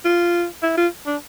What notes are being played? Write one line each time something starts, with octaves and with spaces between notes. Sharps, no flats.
F4
E4
F4
D4